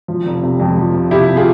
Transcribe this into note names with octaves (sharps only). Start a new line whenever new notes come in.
F3
F1
C3
F2
F3
C3
C3 E4 G4
C3
F4 G#4